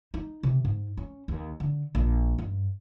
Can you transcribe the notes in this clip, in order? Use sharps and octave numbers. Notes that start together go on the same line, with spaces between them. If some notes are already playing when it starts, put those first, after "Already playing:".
D#4
C3
G#2
C#4
D#2
D3
A#1
G2